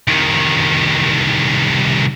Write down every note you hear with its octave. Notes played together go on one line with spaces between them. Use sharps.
C2 D#3